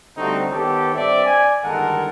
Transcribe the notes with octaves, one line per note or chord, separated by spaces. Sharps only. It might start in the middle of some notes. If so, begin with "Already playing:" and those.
D3 G3 A3 C4 D#4 F#4
D#3 B3 G4 A4 C#5
G2 C4 D5 E5
D5 G#5
G1 D#3 G#3 A4 A#4 F#5